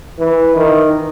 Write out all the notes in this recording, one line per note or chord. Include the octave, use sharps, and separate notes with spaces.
E3
D#3